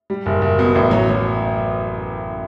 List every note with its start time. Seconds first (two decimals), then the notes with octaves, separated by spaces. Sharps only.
0.10 G3
0.26 F#1
0.42 F#1
0.59 B2
0.75 A1
0.91 F#3
1.09 F#3